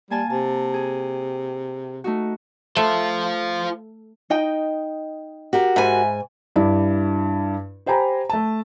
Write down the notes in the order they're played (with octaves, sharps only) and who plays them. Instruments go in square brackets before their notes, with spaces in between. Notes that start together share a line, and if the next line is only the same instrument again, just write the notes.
[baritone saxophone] G3 [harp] A#3 G#5 A5
[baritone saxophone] C3 [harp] A5
[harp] G#4
A3 D#4 F#4
[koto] A3 [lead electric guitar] F4 C5
[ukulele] D#4 D#5 G5
[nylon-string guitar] F#4 G4 A#4
[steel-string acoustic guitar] G#2 G#5 [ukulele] E5 B5
[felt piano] G2 E4 D5
G4 C5 G5 G#5 A#5 B5
A3 A5